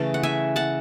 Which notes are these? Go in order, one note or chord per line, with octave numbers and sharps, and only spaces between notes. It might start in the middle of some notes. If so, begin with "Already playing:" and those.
Already playing: C#3 E3 A3 C#4 A5
F#5
E5 G#5
F#5 A5